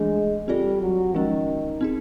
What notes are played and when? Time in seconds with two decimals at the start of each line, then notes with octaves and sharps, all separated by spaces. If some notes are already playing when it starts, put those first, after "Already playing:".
Already playing: E3 G#3 A3 D4
0.48 G3 C4 F4 A4 D5
0.82 F#3
1.14 D#3 F3 G#3 C#4
1.81 C4 D#4 G#4